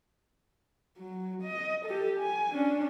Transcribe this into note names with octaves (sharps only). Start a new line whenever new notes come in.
F#3
D#5
G4 A4
G#5
C#4 D4